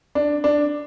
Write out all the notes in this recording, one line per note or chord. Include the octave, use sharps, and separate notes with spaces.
D4
D4